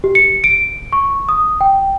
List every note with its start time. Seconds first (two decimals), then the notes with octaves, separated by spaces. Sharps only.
0.04 G4
0.15 C#7
0.44 D7
0.93 C#6
1.29 D#6
1.61 G5